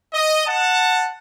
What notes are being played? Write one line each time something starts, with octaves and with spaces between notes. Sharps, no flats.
D#5
F#5 A5